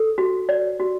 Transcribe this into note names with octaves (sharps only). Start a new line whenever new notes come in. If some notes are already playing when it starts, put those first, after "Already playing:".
Already playing: A4
F#4
D5
F#4